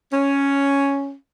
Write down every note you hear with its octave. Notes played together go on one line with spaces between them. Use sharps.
C#4